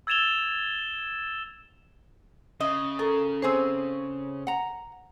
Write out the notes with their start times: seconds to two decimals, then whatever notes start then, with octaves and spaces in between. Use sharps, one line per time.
0.07 E6 G#6 A6 E7 F7 G7
2.60 C#3 D#5
2.99 A4 A#4
3.42 C4 G#4 C5 C#5
4.47 F#5 A#5